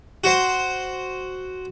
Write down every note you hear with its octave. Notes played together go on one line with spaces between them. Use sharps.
F#4 C5